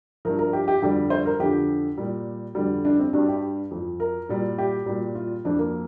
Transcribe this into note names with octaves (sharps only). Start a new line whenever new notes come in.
G2 F3 A#4
A#4
G4
G4
F2 D3 G3 G4
C5
A#4
F2 D3 F3 G4
A#2 G3
F2 D3 G3
D4
C4
G2 G3 D4
G4
F2 F3
A#4
A#2 G3
G4
A#2 G3
F4
F2 F3 D4
A#3